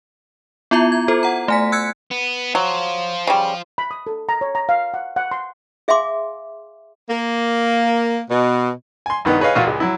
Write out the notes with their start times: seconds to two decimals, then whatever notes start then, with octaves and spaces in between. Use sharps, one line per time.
0.71 B3 E4 F4 E5 A#5
0.92 G#6
1.08 F4 A4 C5
1.23 F#5 A#5
1.48 A3 G#5 B6
1.72 E6 F#6 G#6 C#7
2.11 B3
2.55 F#3 F4 C5
3.27 C#3 G3
3.78 B5
3.91 D#6
4.07 A4
4.29 A#5
4.41 C#5
4.55 A#5
4.69 F5
4.94 F#5
5.16 F#5
5.31 C6
5.88 G#4 E5 F5 G#5 C6 D6
7.10 A#3
8.29 B2
9.06 G#5 C6
9.25 C2 G2 D#3 B3 D#4
9.40 G#4 B4 C#5 D#5 F5
9.55 A1 A#2 F4 F#4 F5
9.67 C#2 G#3
9.80 F#3 E4